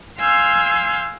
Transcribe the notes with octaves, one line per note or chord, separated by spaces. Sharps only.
F5 G#5 C6 E6 F6 G6